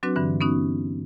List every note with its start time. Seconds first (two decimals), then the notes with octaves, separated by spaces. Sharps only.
0.03 F#3 C4 D4 F#4 B4
0.16 G2 D3 E3
0.41 B3 C#4 D#4 F#4